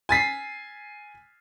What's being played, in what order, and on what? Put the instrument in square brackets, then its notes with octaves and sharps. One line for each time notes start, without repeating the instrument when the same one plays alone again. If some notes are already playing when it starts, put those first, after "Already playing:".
[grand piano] G#5 A6 B6 C7